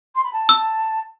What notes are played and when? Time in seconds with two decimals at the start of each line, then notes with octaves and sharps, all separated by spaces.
0.15 C6
0.24 B5
0.33 A5
0.49 E6